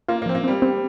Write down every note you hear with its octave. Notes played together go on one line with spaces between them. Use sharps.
A#3 F4
A#3
F3 C4
A#3
G3 C4
C4